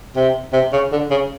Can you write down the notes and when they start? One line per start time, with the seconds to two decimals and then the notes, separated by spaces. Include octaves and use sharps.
0.16 C3
0.53 C3
0.73 C#3
0.92 D3
1.10 C#3